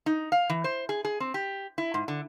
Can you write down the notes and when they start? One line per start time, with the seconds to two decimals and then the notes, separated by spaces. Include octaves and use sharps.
0.06 D#4
0.32 F5
0.50 E3
0.64 C5
0.89 G#4
1.05 G#4
1.20 C4
1.34 G4
1.78 E4
1.94 G#2
2.08 D3